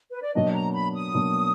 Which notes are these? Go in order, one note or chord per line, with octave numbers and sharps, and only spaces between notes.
B4
D5
B2 F#3 A#3 D4 D#5
A#5
B5
D#6
B2 F#3 A#3 D4